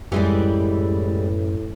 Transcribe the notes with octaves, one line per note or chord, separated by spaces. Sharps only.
F#2 A2 E3 G3 G#3 E4 G4